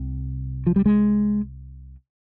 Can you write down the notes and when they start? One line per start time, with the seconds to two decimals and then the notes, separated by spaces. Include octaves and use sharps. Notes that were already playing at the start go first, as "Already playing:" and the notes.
Already playing: C2 C3
0.67 F3
0.76 G3
0.86 G#3